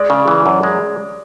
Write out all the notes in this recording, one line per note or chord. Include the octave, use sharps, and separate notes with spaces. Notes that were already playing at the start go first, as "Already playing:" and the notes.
Already playing: G#3 D5
C#3
E3
F#2
G#3